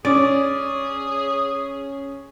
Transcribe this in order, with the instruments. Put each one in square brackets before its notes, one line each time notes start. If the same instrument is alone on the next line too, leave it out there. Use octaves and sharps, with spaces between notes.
[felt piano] C#4 [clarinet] G#4 [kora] D5